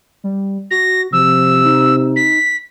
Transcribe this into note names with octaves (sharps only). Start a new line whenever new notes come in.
G3
F#4 A#6
C3 F3 E6
D#4
B6